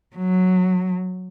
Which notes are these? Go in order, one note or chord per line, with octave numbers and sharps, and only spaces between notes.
F#3